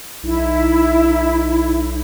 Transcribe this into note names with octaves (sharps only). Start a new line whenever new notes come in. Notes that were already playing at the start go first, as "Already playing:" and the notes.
B1 D#4 E4